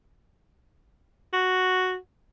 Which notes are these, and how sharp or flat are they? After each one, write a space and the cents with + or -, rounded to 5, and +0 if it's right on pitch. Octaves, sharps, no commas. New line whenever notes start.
F#4 +0